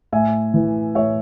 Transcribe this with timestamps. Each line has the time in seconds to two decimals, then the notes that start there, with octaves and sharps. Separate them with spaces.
0.12 A2 E5 G#5
0.54 E3
0.95 A2 C#5 E5